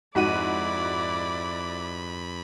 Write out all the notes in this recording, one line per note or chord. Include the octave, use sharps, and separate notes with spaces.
F2 G#2 E4 F#4 D5 B5 D#7